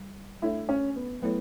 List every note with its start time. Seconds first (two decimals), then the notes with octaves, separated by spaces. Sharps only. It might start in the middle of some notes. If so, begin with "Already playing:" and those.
Already playing: G3
0.42 A3 D4 E4 A4 C#5
0.69 C#4
0.96 B3
1.22 F#3 A3 B3 E4 A4 C#5